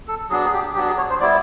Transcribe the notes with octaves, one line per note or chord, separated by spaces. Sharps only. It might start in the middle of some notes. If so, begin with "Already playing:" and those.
A4
F#3 B3 D4 G#4
G#4
G4
F#3 B3 D4 G4
G#4
C#5
C5
G3 B3 E4 D5